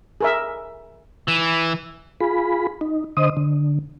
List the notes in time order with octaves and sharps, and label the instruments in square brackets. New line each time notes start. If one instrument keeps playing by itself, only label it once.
[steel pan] G#4 A#4 E5
[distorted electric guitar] E3
[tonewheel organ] F4 G#4 B5
D#4
D3 C5 D#5 D#6
D3